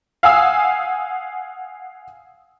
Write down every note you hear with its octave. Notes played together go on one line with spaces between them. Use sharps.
F5 F#5 G#5 D#6 E6